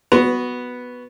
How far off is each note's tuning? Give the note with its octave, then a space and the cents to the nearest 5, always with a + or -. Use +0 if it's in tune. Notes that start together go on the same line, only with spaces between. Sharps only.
B3 +0 F#4 +0